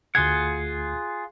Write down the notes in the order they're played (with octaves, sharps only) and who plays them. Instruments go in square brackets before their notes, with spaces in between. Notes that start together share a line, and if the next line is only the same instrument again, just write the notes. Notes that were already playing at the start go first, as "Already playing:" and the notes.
[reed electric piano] D2 G#6 [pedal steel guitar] F4 G#4 F#5